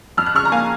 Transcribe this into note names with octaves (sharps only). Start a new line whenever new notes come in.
F2 F6
F#6
C#3 C#6 F6
A#5
A#3 F5 G#5